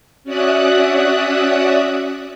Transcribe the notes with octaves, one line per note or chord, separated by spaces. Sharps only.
C#4 F#4 D5 E5 D#6 F#6